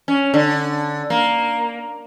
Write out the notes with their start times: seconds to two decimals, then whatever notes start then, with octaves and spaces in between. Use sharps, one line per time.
0.08 C#4
0.34 D3
1.10 A#3